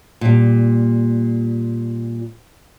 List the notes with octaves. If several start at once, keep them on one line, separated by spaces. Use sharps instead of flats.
A#2 G3